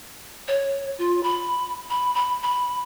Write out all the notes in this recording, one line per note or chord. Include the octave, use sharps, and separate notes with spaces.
C#5
F4
B5
B5
B5
B5